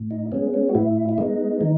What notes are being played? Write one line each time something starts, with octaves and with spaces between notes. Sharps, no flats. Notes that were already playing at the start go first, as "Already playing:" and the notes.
Already playing: A2
D#4
G#3 B3 C#4
C#4
F#4
A2 E4
E4
G#3 B3 D#4
D#3